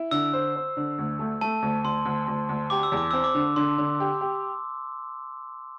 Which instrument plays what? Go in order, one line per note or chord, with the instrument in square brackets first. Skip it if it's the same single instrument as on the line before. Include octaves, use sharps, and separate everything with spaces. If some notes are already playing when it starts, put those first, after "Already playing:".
Already playing: [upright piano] E4
[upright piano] D3 [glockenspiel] E6
[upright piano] C5
C5
D3
D2
A3
[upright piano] A3 [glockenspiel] A5
[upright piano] D2
[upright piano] D2 [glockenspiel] C6
[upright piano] D2
D2
D2
[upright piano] G4 [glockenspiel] D6
[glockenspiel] E6
[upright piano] E2
[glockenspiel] D6
[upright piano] C4 [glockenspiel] E6
[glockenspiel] D6
[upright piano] D3
[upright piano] D3 [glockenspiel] C6
[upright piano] D3
G4
G4